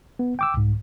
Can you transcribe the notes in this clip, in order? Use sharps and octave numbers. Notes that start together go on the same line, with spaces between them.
B3
G5 D6 E6
C2 G#2